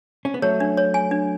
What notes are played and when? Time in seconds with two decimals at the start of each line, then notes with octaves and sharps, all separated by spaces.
0.25 C#4
0.34 B3
0.42 F#3 A3 C#5
0.60 D4
0.77 C#5
0.94 G#5
1.11 D4